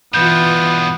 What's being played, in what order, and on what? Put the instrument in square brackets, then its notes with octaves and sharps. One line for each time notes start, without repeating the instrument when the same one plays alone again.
[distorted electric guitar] G2 B2 [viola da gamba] E3 F4 [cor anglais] B3 [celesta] G6